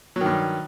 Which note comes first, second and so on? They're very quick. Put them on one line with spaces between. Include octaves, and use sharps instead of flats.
F#3 D#3 G2